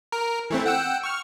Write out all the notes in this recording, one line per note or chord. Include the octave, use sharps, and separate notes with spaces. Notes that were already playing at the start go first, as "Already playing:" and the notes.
A#4
E3 A3 C4
F#5 G5 E6
C#6 F6